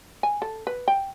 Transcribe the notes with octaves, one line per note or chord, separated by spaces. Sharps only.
G#5
A4
B4
G5